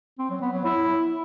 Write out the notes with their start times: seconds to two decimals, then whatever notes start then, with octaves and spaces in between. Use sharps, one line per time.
0.19 C4
0.30 F#3
0.42 B3
0.53 F#3
0.65 E4